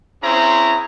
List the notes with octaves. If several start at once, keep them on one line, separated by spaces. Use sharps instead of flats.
C4 C#4 E4 G#4 C5 A#5